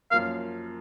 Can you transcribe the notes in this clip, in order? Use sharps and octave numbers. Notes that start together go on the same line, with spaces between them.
F#2 F3 A#3 F5